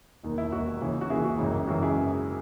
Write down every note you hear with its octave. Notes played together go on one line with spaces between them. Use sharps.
E1 D#2 D#3
E4
E1 D#2 D#3 F#4
D#2 C#3 E3
F#4
D#2 C#3 E3 E4 G#4
F#4
G#1 F#2 C#3 E3 E4
G#1 F#2 C#3 E3 F#4
E4 G#4